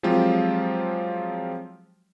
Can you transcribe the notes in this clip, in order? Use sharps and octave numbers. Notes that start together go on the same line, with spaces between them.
F3 F#3 G#3 C4 F4 G4